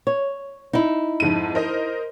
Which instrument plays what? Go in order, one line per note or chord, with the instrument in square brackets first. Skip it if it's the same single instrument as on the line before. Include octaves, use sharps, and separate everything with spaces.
[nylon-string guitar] C#5
D#4 E4
[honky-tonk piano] F2 G#2 D#7
A#4 C5 D#5